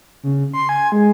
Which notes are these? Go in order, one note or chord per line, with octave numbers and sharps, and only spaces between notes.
C#3
C6
G#5
G#3